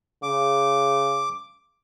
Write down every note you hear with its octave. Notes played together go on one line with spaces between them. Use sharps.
C#3 D6